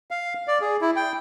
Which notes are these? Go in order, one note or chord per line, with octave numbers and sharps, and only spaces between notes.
F5
D5
G#4
E4
G5